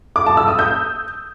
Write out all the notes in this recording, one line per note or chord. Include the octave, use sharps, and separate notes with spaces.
D6
A5
E6
D#6
G6